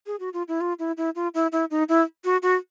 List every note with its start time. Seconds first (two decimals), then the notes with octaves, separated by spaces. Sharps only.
0.06 G#4
0.20 F#4
0.33 F4
0.48 E4
0.61 F4
0.79 E4
0.97 E4
1.15 F4
1.34 E4
1.52 E4
1.71 D#4
1.89 E4
2.24 F#4
2.42 F#4